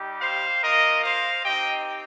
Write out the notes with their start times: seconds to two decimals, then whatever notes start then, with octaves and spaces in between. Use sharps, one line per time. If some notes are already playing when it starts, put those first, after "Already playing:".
Already playing: G3 D#4 G4
0.22 C5 F5
0.63 A#3 F4 A#4 D#5
1.04 C5 F5
1.45 C4 D#4 G4 D#5 G5